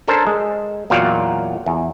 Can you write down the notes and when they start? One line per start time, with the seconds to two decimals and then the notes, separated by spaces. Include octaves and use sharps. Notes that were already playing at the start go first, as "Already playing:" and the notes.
0.08 C#4 D4 A4 A#4 C5
0.27 G#3
0.90 E2 A#2 F#3 D5 F5 G5
1.66 E2